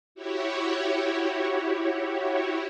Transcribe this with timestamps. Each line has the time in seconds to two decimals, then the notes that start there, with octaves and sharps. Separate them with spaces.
0.15 E4 F#4 G4 C#5